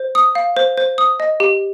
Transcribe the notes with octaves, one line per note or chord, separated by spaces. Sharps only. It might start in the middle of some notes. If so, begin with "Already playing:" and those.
Already playing: C5
D#6
F5
C5
C5
D#6
D#5
G4